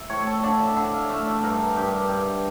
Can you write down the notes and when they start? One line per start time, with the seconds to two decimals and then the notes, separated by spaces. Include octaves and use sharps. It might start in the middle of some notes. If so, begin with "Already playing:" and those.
Already playing: E5
0.10 A2 C#5
0.27 A4
0.43 D3 D5
0.60 E5
0.76 D3 E5
0.93 F5
1.09 A3 E5
1.26 D5
1.43 G2 A#4
1.76 G2 G4
2.09 G2